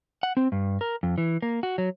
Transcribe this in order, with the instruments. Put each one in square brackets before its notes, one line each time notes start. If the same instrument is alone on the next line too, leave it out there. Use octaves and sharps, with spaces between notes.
[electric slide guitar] F#5
C4
G2
A#4
F2
E3
A#3
F#4
F#3